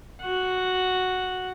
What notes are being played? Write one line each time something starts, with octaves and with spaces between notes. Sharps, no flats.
F#4 F#5